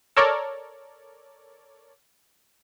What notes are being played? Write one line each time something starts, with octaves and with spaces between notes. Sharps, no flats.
A4 A#4 C#5 D5